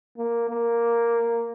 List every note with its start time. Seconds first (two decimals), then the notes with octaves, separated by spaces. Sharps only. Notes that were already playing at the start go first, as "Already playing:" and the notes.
0.18 A#3
0.50 A#3